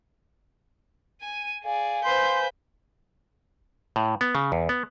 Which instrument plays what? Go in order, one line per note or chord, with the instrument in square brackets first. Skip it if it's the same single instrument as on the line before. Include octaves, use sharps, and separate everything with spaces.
[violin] G#5 D#7
[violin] G#4 D5 [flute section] F5 G#5
[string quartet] B4 C5 [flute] C6 [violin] G6 B6
[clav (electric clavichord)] A2
B3
C#3
E2
B3